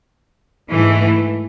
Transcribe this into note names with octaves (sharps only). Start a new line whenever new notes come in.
G#2 E3 A3